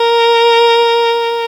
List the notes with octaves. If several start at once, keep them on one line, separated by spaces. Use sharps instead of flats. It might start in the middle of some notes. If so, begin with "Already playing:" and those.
Already playing: A#4